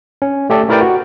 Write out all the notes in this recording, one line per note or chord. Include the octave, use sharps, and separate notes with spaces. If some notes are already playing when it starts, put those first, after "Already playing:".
C#4
A3 G4 A4 D5
A3 E4 A#4 B4 D5 G5
F#4